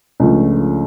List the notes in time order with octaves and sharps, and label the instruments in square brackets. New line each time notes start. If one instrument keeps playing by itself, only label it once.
[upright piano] C#2 C#3 F3 A3 D4